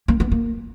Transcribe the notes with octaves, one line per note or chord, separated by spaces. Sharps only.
A#3
B3
A#3